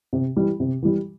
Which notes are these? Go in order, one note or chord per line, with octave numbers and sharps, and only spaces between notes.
C3
E3 G3
C3
E3 G3